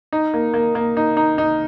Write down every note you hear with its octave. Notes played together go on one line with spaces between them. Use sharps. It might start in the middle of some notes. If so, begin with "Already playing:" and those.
D#4
A#3
A#3
A#3
D#4
D#4
D#4